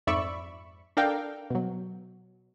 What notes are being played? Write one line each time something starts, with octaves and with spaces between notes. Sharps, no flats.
F2 G#2 D5 E5 B5 C#6
D4 A4 A#4 D5 F5 G5
B2 F#3